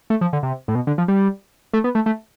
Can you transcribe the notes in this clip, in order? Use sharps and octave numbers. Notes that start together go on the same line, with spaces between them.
A3
F3
D3
C3
A2
B2
D3
F3
G3
A3
B3
A3
A3